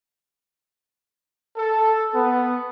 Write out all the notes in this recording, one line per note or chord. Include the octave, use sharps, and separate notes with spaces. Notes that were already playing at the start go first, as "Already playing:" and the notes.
A4
B3